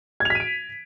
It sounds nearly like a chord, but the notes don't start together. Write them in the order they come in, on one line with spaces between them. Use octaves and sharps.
G#6 F7 B6 D#7 D7